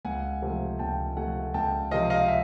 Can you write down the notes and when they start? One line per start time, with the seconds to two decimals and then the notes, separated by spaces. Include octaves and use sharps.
0.05 C#2 F#5 G#5
0.42 C3 F3 A3
0.79 C#2 G5 A5
1.17 C3 F3 A3 F#5 G#5
1.54 C#2 G5 A5
1.91 C3 F3 D#5 F5
2.10 D#5 F5
2.28 E5